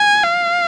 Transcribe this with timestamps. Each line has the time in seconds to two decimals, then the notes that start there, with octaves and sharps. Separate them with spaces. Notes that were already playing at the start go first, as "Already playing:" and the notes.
Already playing: G#5
0.24 F5